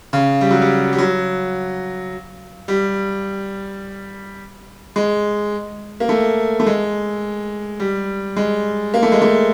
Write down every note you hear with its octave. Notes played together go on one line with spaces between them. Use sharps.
C#3
G3
F#3
G3
G3
F#3
G3
G#3
A#3
A3
A3
G#3
G3
G#3
A#3
A3
G#3
A3